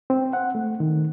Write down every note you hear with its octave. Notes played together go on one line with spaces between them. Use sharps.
C4
F#5
A3
D#3